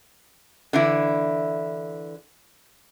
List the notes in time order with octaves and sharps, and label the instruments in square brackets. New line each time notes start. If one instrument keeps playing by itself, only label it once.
[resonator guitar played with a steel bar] D3 E3 E4